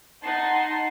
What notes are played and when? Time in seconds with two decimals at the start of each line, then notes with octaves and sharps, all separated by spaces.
0.23 D#4 F#5 A5 C6